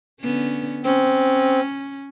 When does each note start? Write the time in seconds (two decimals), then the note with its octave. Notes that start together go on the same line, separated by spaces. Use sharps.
0.20 D3 B3 C#4
0.84 C4 C#4